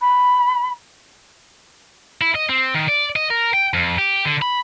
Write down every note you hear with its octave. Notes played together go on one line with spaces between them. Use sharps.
B5
E4
D#5
C4
D#3
D5
D#5
A#4
G5
F2
G4
D3
B5